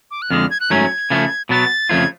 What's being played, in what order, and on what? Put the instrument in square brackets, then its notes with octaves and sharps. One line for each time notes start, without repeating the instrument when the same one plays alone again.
[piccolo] D6
F#6
[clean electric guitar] F2 D3 G#3 [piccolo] F6
[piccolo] G#6
F#6
[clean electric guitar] G#2 F#3 A3 C#4 [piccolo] G#6
[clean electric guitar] C#3 F3 A3
[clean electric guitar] B2 F#3 B3 [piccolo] A6
[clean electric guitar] F2 C#3 F3 A3 F4 [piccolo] G#6